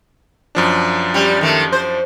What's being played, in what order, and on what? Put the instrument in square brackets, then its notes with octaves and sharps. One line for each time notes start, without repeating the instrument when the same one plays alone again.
[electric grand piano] F#2 F3 D4
[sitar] G3 C#4
D#3 A3
C5